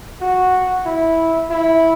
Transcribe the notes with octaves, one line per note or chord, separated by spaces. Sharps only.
F#4
E4
E4